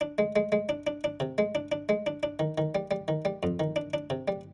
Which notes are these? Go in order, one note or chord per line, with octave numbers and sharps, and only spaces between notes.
D4
G#3
G#3
G#3
D4
D4
D4
C3
G#3
D4
D4
G#3
D4
D4
D#3
D#3
G3
G3
D#3
G3
F2
D#3
D4
D4
C3
G3